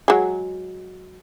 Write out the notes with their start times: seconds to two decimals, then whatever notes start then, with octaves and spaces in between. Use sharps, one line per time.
0.08 F#3 G#3